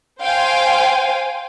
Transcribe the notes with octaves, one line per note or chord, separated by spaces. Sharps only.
C5 F5 G5 G#5